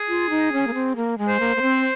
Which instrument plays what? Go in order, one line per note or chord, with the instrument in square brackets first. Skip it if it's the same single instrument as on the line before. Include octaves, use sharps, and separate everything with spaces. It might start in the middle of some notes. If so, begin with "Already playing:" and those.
Already playing: [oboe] G#4
[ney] F4
D#4
C#4
A#3
C4
A#3
G#3
[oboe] C5
[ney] A#3
A#3
C4